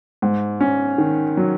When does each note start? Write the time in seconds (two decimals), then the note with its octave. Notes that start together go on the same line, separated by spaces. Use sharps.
0.22 G#2
0.61 C#4
0.98 D#3
1.37 F#3